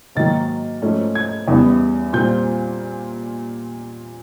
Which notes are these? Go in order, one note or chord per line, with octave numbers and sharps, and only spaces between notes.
G#2 D#3 F#3 A#3 A6
G#2 F3 A3 C#4
G#6
E2 C#3 E3 G3 B3
A#2 G3 C4 F4 G6